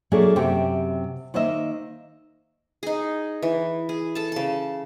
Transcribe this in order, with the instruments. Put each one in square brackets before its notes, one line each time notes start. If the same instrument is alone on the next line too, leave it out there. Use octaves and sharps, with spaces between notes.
[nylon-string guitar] B2 F#3 A3 A#3 D4 G#4
F#2 C3 G4 C5 G5
D#3 A#3 C5 D#5 E5
[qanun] D#4 G#4
E3
G#4
A4 A5
C#3 A5